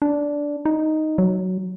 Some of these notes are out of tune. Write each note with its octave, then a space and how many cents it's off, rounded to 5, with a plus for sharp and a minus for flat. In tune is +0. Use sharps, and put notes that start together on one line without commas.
D4 -10
D#4 +0
F#3 +5